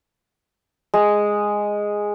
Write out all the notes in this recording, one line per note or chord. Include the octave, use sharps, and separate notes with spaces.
G#3